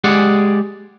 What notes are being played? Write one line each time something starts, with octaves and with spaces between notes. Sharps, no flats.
G#3 G4 G#4 D5 F#5